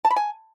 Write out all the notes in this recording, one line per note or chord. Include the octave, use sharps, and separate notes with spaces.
A5
B5
G#5